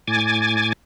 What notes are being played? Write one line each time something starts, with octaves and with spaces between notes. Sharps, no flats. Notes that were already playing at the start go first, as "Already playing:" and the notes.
A2 G#5 D6 G#6 A6